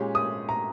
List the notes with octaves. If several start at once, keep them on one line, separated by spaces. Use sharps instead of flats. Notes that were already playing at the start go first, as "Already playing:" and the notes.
Already playing: A#2 G#3 C#4 G4
D#6
A#5